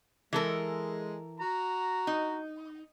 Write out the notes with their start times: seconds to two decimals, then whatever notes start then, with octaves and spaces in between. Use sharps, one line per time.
0.33 E3 G#3 A4 A#4
1.40 F#4 A#5
2.07 D#4